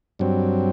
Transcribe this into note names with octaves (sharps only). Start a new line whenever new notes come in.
G2 F#3 C4